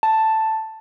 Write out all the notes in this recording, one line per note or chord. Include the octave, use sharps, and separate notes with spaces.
A5